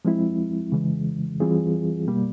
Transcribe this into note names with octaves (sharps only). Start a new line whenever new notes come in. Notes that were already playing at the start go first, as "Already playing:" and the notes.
F3 G#3 C4 E4
C#3 E3 G#3
E3 G3 C4 F4 G#4
B2 G3 A#3